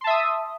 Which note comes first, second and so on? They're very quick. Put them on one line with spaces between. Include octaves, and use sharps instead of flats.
C6 A5 E5 D#6